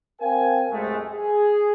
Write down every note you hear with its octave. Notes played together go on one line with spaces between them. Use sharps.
C4 A#4 F5 G5 G#5
C2 F#2 G#3 A3
G#4